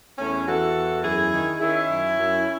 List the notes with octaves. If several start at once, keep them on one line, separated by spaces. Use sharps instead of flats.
E2 A3 C#4
E3 F#4 A4
E2
F#2 E4 G#4
D#3
D#3 C#4 E4
F#2
F#2